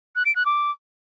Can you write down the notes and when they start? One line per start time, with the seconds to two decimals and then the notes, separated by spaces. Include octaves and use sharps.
0.15 F#6
0.25 D7
0.35 F#6
0.45 D6